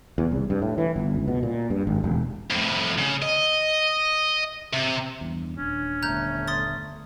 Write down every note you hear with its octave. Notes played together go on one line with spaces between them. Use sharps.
E2
C2
G2
A2
E3
G1
C#2
B2
A#2
G2
G#1
E1
F2 A2
C#3
D#5
C3
E2 G2
D#1 C#4 D4
G1 A3 A#5 F#6 G6
C6 D#6 A6